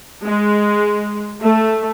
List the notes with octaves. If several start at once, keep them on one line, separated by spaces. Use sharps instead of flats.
G#3
A3